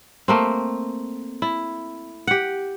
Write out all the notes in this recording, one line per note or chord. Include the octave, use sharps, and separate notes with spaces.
A3 A#3 C4
E4
G4 F#5